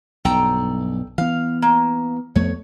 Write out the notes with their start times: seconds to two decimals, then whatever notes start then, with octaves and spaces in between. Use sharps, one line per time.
0.25 B1 G2 A4 G5 A#5
1.18 E3 B3 F5
1.62 A#3
2.35 F2 A3 B3 C#5